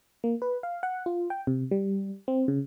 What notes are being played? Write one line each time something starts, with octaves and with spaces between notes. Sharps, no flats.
A#3
B4
F5
F#5
F4
G5
C3
G3
C4
C#3